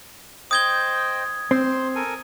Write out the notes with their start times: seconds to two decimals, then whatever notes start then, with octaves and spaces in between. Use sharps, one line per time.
0.51 C5 D#5 G5 D#6 G#6 G7
1.51 C4 C5 C6
1.95 A4 A#4 G#5